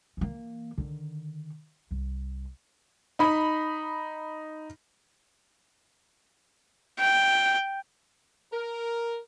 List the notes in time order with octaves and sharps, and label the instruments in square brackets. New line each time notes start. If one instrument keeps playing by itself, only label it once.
[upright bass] E3 A#3
D3 D#3
C2
[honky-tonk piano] D#4 B5
[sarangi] G5
[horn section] A#4